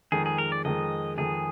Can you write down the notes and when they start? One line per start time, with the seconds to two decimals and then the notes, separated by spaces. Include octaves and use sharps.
0.12 F2 D#3 G#3 G#4
0.26 G#4
0.38 A#4
0.52 D5
0.65 F2 D#3 G#3 D#5
1.18 F2 D#3 G#3 G#4